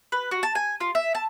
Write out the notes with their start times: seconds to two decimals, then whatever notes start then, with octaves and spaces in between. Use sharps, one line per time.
0.12 B4
0.31 F#4
0.43 A5
0.55 G#5
0.80 F4
0.95 E5
1.15 A5